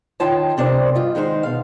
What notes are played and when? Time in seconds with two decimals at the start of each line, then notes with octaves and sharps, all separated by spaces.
0.20 D#3 D#4 F4 C#5 G5 A5
0.57 F2 C3 D4 A#4 C5 D5
0.95 G2 F4 D#5
1.15 D#3 G#3 D#4 A#4 C5
1.43 B2 F5